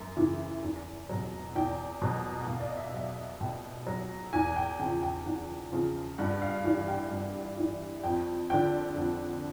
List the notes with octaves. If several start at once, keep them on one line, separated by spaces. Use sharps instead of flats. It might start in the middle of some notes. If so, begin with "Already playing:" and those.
Already playing: F#2
C#3 E3
E2
B2 F#3
E2 G5
B2 F#3
F#5
B2 F5
D5
D#5
E5
F5
F#3 F#5
B2 G5
F#3
E2 G#5
G5
C#3 F3 G5
G5
E2 F#5
C#3 F3
G2 F#5
F5
E3 G3 F#5
G5
G2 F#5
E3 G3
F2 G5
D3 F3 G5
F2 F#5